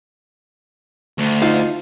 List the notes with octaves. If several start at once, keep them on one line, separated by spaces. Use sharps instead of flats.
D2
D#4 F4 F5